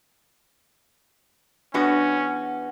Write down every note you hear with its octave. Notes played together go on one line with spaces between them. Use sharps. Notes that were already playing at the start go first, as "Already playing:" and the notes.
E2 B3 C#4 D4 F#4